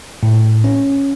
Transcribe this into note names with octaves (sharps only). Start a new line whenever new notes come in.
A2
C#4